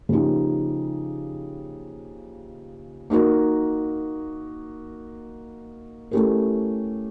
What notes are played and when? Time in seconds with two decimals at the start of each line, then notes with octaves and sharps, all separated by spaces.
0.09 C#3 F3 A#3 D#4 G4
3.10 A#3 D#4 F#4 A#4
6.11 A3 C#4 E4 G4 A#4